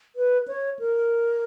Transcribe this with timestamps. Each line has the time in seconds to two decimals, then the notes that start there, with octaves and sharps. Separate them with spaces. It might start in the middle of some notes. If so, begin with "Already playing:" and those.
0.16 B4
0.48 C#5
0.79 A#4